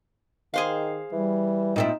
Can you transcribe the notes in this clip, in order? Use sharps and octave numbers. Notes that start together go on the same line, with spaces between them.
D#3 G#4 C5 F5
E3 G3
A#2 C4 D#4 E4